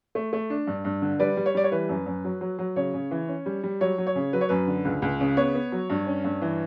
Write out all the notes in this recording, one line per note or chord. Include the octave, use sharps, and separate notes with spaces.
A3
A3
D4
G2
G2
D3
G3 B4 D5
G3
C#5
G3 D5
C#5
E3 B4
F#2
F#2
F#3
F#3
F#3
C#3 C#5
C#3
E3
C#4
G3
G3
F#3 C#5
F#3
C#5
C#3
F#3 B4
C#5
F#2 B4
D3
C#2
C#2
C#3
B3 C#5
B3
F#3
G2
C#4
G2
E3